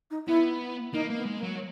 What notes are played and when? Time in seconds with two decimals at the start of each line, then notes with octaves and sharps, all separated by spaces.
0.11 D#4
0.27 B3 E4
0.93 A#3 D#4
1.10 A#3
1.16 B3
1.26 G#3
1.37 A#3
1.43 F#3